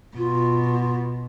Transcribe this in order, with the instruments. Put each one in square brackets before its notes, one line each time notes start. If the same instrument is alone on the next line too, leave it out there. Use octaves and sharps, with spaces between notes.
[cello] B2 [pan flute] F4